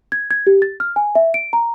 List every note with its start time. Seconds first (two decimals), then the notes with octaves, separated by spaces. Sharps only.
0.12 G#6
0.31 G#6
0.47 G4
0.62 A6
0.80 F6
0.96 G#5
1.15 E5
1.34 D7
1.53 A#5